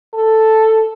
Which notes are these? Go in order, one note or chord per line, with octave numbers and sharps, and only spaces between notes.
A4